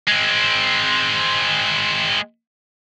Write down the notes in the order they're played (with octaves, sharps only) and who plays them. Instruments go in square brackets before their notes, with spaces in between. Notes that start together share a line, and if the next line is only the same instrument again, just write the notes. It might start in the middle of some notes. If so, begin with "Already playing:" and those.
[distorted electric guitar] G#3 C4